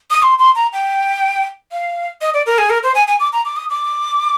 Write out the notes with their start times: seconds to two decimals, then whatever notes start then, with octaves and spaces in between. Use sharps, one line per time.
0.11 D#6
0.22 C6
0.39 C6
0.55 A#5
0.73 G5
1.72 F5
2.21 D#5
2.34 D5
2.46 A#4
2.58 G#4
2.70 A#4
2.83 C5
2.95 G#5
3.08 G#5
3.20 D6
3.33 A#5
3.45 D6
3.56 D#6
3.70 D6